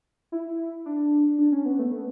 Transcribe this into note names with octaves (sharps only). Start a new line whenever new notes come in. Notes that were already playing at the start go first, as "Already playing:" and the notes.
E4
D4
D4
C#4
B3
A3
B3